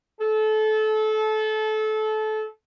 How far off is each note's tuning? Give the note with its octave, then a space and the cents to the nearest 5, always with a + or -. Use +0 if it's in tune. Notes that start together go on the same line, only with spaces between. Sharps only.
A4 -25